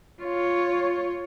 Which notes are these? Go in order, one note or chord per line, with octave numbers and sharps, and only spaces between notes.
F4 C#5